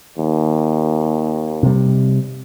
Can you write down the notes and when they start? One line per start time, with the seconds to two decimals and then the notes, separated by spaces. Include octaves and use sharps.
0.18 D#2
1.63 C3 G3